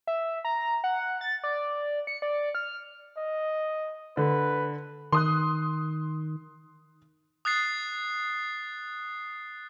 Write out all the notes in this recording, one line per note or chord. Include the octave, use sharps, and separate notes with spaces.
E5
A#5
F#5
A6
D5
C#7
D5
F6
D#5
D3 B4
D#3 C6 D#6 F#6
D#6 F#6 A6 C7